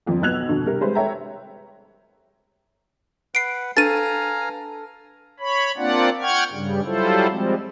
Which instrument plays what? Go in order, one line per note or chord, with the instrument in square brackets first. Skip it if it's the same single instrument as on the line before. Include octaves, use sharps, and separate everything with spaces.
[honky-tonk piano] G1 F2 C4
B1 B3 E6 F#6 G#6 F7
F1 B2 D3
C3 G3 A#4
G3 G#3 B4 C5
A4 C#5 E5 G5 A#5
[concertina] B4 F#5 [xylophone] C7 D7
[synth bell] D4 B4 [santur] A4 [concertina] F5 G#5 A#5 [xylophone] A6 D#7
[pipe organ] C#5 B5
A#3 C4 D4 F4 D5 F#5
F#5 G5 C#6 F6 G#6
G2 C#3 G3
F#3 G3 E4 F4 A4 C5
F3 G3 G#3 C4